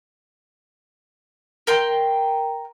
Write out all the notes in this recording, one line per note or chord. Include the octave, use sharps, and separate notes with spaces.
A#4 G5 C6